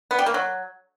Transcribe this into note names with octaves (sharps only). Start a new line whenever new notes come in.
B3
G3
A#3
F#3